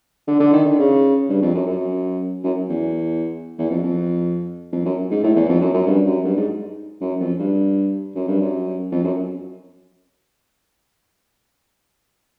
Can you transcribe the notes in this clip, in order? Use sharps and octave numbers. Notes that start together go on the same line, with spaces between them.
D3
D3
D#3
D3
C#3
G2
F2
F#2
F#2
F#2
E2
E2
F2
F2
F2
F#2
G#2
A2
E2
F2
F#2
F#2
G2
F#2
G2
G#2
F#2
F2
G2
F#2
G2
F#2
F2
F#2